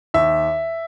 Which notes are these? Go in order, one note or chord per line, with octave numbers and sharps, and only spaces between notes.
D#2 E5